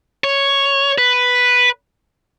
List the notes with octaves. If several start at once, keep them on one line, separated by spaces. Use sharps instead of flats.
C#5
B4